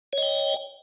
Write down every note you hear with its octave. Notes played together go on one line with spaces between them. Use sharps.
C#5 D#5 G5